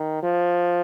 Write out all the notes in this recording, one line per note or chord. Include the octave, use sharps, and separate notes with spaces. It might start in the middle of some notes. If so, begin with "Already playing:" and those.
Already playing: D#3
F3